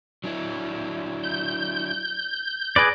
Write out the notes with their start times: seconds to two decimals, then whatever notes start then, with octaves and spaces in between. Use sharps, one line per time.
0.24 F#3 D4 E4
1.23 G6
2.76 G#4 B4 D5 G#6 A#6 D7